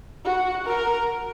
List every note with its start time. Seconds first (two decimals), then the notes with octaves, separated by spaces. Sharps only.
0.25 F#4
0.66 A#4